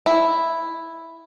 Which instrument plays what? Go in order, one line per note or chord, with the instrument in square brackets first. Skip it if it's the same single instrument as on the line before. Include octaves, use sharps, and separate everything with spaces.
[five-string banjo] E4